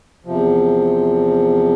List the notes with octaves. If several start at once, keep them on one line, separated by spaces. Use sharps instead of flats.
E2 C3 F3